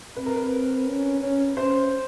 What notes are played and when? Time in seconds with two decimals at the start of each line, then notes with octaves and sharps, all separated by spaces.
0.17 C4 B4
0.26 A#4
0.36 B4
0.87 C#4
1.21 C#4
1.57 C#4 C5